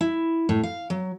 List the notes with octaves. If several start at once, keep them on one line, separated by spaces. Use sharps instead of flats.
E4
A2
F5
F#3